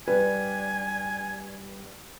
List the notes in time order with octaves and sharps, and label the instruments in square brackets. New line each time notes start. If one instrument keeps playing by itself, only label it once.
[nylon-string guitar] G2 G3 [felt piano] B4 [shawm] G#5